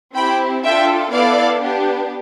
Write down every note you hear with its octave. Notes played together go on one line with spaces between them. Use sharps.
C4 E4 G4 G5 B5
D4 F4 A4 E5 G5
B3 E4 A4 D5 F5
B3 D4 G4